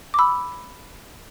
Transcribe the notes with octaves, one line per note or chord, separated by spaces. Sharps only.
D6
B5 E6